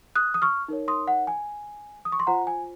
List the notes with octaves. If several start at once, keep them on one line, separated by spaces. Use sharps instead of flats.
D#6 F#6
D#6
C#6 F6
D#4 A#4 C#5
C6 D#6
F#5
G#5
D#6
C#6
C6
F4 C5 F#5 A#5
G#5